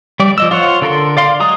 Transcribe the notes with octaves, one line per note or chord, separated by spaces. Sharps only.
G3 D5
F3 D#5 E6
F4 C5 C#5 F#5
D3 A4 A#4 C6
D5 F5 C6
F#3 G#3 A#5 D#6